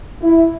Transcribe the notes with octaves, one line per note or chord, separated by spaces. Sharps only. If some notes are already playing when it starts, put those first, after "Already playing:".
E4